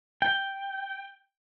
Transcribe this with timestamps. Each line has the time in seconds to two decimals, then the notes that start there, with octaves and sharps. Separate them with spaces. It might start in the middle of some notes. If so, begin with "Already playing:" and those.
0.22 G5